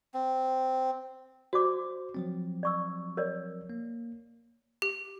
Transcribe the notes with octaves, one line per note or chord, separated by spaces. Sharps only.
C4
F#4 C5 D5 D6
F3 F#3 C4
D5 C#6 E6
A#4 C#5 D5
A#3
G4